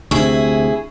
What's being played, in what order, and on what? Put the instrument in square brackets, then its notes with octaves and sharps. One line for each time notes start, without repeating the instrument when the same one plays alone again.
[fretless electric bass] D2 C3 [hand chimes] D4 C#6 [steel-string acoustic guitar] E4 G#4